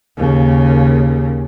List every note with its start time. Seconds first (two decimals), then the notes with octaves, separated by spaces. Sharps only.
0.18 D#2 C#3